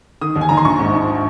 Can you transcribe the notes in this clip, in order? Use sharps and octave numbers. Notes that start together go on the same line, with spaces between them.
D#3 D#6
D#2
G#5
D#2 A#5
C6
A#1 C#6
G#2
G#2